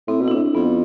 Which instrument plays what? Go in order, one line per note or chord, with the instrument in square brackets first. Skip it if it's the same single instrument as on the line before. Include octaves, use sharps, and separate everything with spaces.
[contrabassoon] A2 [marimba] C4
[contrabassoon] B2
[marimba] E4
[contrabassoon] A2 [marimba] D4
[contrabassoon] F2 [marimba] B3